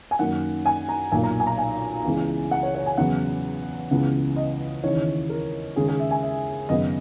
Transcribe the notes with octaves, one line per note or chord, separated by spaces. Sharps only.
G#5
F#2 D#3 A#3 F#5
G#5
A#5
B1 A#2 A#3 G#5
A#5
G#5
A#5
G#5
C#2 C#3 E3 G#3 B3
F#5
C#5
C#5
G#5
E2 C#3 F#3 B3 F#5
C#2 C#3 E3 B3
D#5
D#2 C#3 E3 C#5
A#4
D#2 C#3 G#3 G#4
G#4
E5
G#5
E5
G#1 F#2 C#3 F#3 B3 D#5